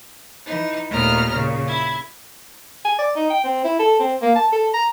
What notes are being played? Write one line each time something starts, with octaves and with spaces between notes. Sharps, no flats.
E3 D#4
D#2 A#2 A3 B3 A#5 F6
A#2 C#3
E4 G#6
G#5
D5
D#4
G5
C4
E4
A4
C4
A#3
A5
A4
A#5